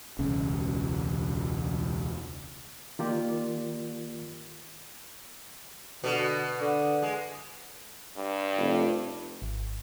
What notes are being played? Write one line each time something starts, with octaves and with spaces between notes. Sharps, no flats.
E1 C#2 C#3
D#3 A#3 F4 G4 A#4 D5
B2 D3
D3
G#3
G2
F1
G#1